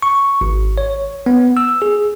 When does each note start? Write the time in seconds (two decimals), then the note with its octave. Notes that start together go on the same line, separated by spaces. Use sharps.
0.02 C#6
0.41 G#1
0.78 C#5
1.26 B3
1.57 E6
1.82 G#4